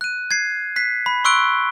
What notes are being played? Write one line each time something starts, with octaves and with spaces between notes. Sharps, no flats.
F#6 D#7
G#6 C7
F#6 B6 C7
B5
C6 C#6 E6 F#6 D7 G7